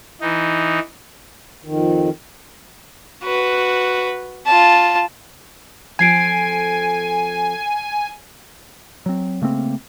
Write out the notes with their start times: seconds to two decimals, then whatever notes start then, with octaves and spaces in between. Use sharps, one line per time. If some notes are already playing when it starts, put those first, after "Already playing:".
0.21 E3 D#4
1.64 F2 D#3
3.24 F#4 B4
4.46 F4 A5
5.99 F3 C4 A4 G#5 G#6 C7 D7
9.06 F#3 C4
9.42 C#3 A3 A#3 C4